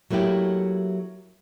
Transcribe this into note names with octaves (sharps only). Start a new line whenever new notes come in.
F#3 A3 A#3 E4 G4